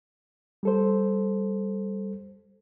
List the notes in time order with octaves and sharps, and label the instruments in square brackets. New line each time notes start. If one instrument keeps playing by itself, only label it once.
[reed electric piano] G3 A4 C5